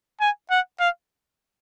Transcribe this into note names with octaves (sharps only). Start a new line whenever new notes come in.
G#5
F#5
F5